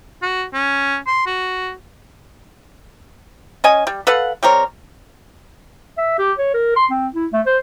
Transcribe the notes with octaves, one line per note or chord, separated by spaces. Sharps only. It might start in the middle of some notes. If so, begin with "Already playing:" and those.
F#4
C#4
C6
F#4
C#4 D#5 G#5
G3
A4 B4 F5 F#5
G3 C4 A#4 C#5
E5
G4
C#5
A#4
C6
C4
E4
A3
C5